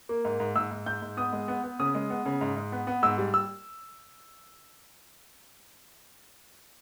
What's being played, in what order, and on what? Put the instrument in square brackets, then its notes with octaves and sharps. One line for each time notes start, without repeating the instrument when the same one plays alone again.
[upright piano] A#3
G#2
G#2
G#2 E6
G#2
G#2 G6
G#2
B3 D#6
G#3
B3
B3
C#3 D#6
G#3
B3
C#3
G#2
G#2
B3
B3
G#2 E6
G3
E6